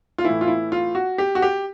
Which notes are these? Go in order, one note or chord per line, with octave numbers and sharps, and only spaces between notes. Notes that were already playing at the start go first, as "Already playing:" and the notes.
F4
A2 E3 E4
F4
E4
F4
F#4
G4
F#4
G4